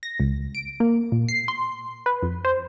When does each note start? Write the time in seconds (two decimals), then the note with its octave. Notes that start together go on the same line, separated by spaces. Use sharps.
0.03 A#6
0.20 C#2
0.55 D7
0.80 A#3
1.12 A#2
1.29 C7
1.48 C6
2.06 B4
2.23 F2
2.45 C5